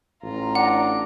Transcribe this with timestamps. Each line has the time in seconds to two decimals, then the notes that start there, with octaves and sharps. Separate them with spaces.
0.23 A1 F4 A#5
0.55 D4 F#5